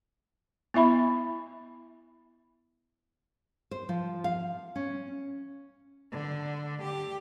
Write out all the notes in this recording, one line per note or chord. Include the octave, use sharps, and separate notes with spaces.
B3 E4 E5 B5
C5
F3
F5
C#4
D3
G4